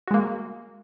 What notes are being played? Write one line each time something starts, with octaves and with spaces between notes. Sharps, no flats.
G#3 A#3 F#4